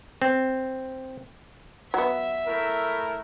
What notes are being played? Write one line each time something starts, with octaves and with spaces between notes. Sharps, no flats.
C4
F#3 B3 E5
A3 E4 A#4